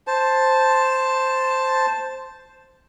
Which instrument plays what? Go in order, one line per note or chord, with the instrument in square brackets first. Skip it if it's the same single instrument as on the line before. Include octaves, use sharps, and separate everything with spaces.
[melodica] C5 A5